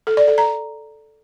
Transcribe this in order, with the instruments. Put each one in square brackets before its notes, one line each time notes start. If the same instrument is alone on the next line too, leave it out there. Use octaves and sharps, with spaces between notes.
[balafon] A4
D5
A4
A#5